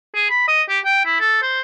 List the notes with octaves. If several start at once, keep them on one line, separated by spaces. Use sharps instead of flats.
G#4
B5
D#5
G4
G5
E4
A4
C5